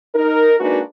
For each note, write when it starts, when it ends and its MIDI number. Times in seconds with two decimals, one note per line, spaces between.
0.15 0.54 63
0.15 0.54 70
0.60 0.80 56
0.60 0.80 58
0.60 0.80 62
0.60 0.80 63
0.60 0.80 66
0.60 0.80 71